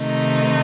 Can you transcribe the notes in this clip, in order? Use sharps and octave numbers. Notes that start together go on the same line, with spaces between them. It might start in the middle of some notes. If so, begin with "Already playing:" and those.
Already playing: C3 D#3 A3 D#4